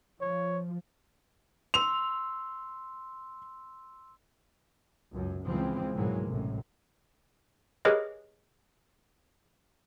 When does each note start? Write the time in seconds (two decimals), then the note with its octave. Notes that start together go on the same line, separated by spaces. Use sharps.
0.21 F3 C#5
1.74 C6 E6 F7
5.13 C#2 F#2
5.45 C#2 E3 F3 G#3 C4
5.94 G#2 B2 E3 F#3 G#3 A#3
6.27 A1 F#2 A2 C3
7.85 G4 G#4 A#4 B4 C#5 D#5